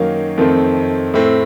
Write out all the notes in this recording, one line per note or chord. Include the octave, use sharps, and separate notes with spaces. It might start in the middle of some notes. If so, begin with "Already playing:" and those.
Already playing: F#2 D#3 F#3 A#3 C#5 F5
F2 D#3 A3 C4
A2 A3 C4